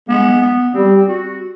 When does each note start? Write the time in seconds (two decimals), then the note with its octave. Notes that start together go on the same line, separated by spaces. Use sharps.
0.08 G#3 B3
0.42 B3
0.74 G3 C4
1.08 F#4